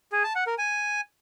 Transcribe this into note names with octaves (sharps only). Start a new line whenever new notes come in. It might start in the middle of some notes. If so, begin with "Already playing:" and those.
G#4
A5
F#5
A#4
G#5